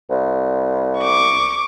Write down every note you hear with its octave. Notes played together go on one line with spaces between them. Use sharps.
C2
C#6 D6